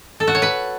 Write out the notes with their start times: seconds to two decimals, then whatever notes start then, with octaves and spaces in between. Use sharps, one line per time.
0.20 A4
0.27 F#4
0.35 C#5
0.42 B4